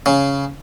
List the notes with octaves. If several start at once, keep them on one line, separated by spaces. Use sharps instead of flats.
C#3